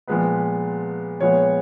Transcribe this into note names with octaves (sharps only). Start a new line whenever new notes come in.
A#2 F3 G#3 B3 B4
A#2 F3 G#3 B3 C#5